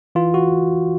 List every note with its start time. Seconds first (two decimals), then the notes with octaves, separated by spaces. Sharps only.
0.15 E3 F4
0.34 F#4